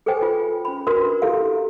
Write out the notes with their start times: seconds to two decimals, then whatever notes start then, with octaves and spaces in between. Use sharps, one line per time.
0.06 G#4 A4 B4 C5 G5 G#5
0.22 F4
0.65 C#4 B5
0.87 D4 F#4 A#4 B4 C6 D#6
1.22 E4 G4 A4 F5